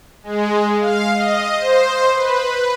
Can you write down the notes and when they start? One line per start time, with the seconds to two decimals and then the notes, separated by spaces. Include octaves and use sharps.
0.23 G#3
0.80 F5
1.13 D#5
1.57 C5
2.13 B4